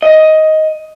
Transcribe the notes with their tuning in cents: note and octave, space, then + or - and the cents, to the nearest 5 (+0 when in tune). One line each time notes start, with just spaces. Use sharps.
D#5 +10